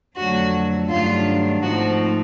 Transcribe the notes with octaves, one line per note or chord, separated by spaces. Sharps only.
F2 D3 F#3 A3 F#4
G2 D#3 F#3 A3 D4 F4
G#2 F3 A3 C4 D#4 F#4